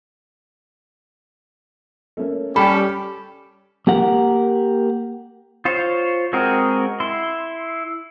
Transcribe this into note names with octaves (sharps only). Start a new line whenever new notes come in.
A3 A#3 C#4
G3 C#4 G4 A4 B5 F6
A#3 G4 A#4 F#5
F4 C5 C#5
G#3 C4 F#4 G#4 A#4
E4 C6